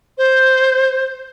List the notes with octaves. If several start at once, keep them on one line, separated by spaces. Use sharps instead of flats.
C5